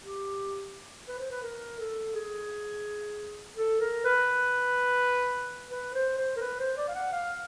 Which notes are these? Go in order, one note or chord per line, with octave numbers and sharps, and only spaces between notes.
G4
B4
C5
B4
A#4
A4
G#4
A4
A#4
B4
B4
C5
C5
A#4
B4
C5
D5
F5
F#5
F5